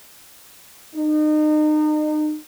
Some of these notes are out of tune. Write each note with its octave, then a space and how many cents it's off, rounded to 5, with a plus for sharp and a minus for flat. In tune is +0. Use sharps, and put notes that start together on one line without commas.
D#4 -35